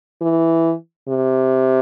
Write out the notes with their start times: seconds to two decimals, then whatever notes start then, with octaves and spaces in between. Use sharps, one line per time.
0.22 E3
1.09 C3